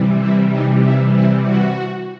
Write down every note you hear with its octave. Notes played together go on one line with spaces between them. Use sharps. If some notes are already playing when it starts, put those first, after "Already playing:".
Already playing: C3 E3 G3
E4
D#4
E4
E4
F#4